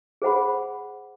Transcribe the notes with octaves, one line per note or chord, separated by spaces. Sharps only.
G#4 C5 F#5 B5